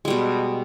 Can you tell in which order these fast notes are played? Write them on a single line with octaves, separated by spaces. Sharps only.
G#3 G3 B2